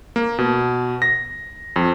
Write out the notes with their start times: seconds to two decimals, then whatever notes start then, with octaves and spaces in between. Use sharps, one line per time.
0.16 A#3
0.38 B2
1.02 A#6
1.76 F2